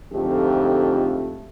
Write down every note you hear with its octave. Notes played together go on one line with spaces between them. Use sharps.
F2 G#2 D3 F3 A3 G4